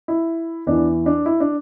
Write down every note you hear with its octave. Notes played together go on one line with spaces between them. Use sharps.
E4
E2 E3 D4
D4
E4
D4